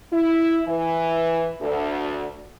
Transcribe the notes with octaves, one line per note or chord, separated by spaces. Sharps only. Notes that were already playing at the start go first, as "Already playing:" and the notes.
E4
E3
D2